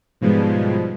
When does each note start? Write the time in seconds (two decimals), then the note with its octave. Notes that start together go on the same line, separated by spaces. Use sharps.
0.21 G#2 B2 F3 G3 G#3